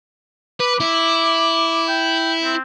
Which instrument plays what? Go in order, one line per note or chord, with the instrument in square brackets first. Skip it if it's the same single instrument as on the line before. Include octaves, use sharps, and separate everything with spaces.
[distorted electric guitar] B4 [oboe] D6
[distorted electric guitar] E4
[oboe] G5
C4